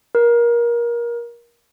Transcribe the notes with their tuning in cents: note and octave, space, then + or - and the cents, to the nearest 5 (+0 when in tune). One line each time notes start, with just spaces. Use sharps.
A#4 +25